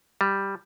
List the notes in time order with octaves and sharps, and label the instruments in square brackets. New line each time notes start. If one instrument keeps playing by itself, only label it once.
[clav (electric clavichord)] G3